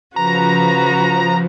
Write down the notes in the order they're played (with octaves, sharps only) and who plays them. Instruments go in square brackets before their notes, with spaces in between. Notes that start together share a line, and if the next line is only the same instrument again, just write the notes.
[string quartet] C#3 F#4 B4 [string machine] F3 [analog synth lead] A#5